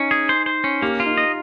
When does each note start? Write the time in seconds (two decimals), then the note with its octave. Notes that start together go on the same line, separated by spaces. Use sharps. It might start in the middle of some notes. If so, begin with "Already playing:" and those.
Already playing: C#4 D#4
0.11 G#4
0.29 C5
0.46 C5
0.64 C#4
0.82 A#3 G4
1.00 F4
1.06 D#4
1.18 D#5